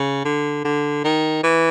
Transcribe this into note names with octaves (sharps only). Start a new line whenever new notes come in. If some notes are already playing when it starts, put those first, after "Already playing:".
Already playing: C#3
D3
D3
D#3
E3